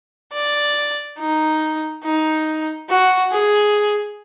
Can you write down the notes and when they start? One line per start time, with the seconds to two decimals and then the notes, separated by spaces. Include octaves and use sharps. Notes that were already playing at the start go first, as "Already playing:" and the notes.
0.33 D5
1.19 D#4
2.04 D#4
2.90 F#4
3.32 G#4